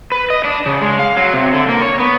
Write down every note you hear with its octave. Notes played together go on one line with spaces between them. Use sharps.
B4
D#5
D4
C#3
G#3
F5
F#3
C3
D3
A#3
C#5
B3